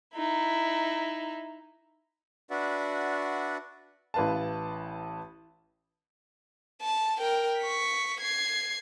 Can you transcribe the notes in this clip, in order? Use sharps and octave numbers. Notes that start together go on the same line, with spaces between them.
D#4 E4
D4 F#4 B4 D5 E5 F#5
A1 E4 B4 F5 A5
A5
A#4 G5
C#6 B6
G#6 C7